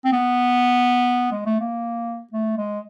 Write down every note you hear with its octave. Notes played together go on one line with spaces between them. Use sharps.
C4
B3
G#3
A3
A#3
A3
G#3